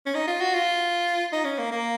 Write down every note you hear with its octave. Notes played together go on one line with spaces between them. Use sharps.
C#4
D#4
F4
F#4
F4
D#4
C#4
A#3
A#3